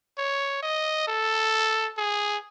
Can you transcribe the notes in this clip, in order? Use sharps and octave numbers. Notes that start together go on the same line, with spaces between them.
C#5
D#5
A4
G#4